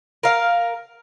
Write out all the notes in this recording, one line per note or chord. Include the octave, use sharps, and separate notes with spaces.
A#4 F5